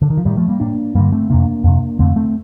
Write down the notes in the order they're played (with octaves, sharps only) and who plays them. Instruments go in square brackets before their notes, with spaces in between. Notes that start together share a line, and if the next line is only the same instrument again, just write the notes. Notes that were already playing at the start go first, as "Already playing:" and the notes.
[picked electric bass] D3
D#3
F3
A2 D#3 G3
F3 A3
G3 A#3
A2 A#3 D4
G2 D3 G3 A#3
A3 C4
F2 C3 A#3 D4
F2 C3
F2 D3 A3 C4
A3 C4